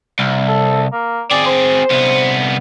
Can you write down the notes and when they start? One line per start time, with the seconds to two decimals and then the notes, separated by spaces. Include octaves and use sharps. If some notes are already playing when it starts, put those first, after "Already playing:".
0.19 C2
0.48 A4
0.92 A#3
1.31 C4 G#4 D5
1.46 C5
1.91 C2 B3